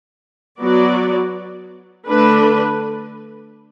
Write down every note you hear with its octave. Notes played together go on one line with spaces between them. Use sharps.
F#3 B3 F#4 D5
D3 A3 D4 B4